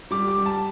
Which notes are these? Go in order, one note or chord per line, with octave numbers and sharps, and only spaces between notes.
G3 D6
D6
G3
A5